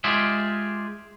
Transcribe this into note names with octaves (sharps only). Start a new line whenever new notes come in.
G#3 F4 G4 G#4 E5